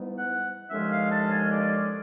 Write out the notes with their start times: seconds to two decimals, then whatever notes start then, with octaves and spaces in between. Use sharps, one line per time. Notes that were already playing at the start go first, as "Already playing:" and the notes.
Already playing: G#2 E3 G3 B3
0.17 F#5
0.70 D#2 D3 F3 G#3 C#4 E5
0.92 F5
1.11 A5
1.31 G#5
1.52 D5